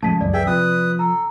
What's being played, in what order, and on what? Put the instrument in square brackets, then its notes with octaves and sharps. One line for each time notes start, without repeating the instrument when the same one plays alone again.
[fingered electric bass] A2 F3 A3 [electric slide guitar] C#3 G#3 [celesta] A5 B6 D#7
[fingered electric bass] C#2 F#2 E3 [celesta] D5
[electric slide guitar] G#4 B4 [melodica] E5 G5
[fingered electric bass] C3 [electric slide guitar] F3 F4 [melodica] B4 D#6
[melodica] A4 [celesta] A#5